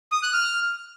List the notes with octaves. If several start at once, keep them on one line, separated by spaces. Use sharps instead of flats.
D#6
F#6
F6